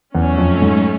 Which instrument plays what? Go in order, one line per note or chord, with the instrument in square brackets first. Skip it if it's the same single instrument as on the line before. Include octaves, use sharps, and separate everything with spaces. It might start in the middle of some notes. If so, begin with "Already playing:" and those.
[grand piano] E2 [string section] F#3 A3 C#4
[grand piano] F2
G#2